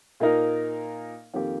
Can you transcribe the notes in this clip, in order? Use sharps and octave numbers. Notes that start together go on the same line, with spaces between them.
A#2 A#3 D#4 A#4
F2 D#3 A#3 G4